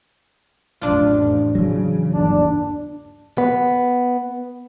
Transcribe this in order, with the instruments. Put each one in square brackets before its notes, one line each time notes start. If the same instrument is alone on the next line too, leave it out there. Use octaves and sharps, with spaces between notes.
[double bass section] A1 F2 F3 [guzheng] D4 F4
[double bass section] C#3 [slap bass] E3 F#3
[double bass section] G1 D#2 [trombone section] D4
[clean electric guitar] B3